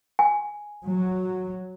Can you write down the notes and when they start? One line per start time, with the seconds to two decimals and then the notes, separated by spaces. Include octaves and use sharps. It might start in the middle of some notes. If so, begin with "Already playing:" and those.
0.19 G#5
0.87 F#3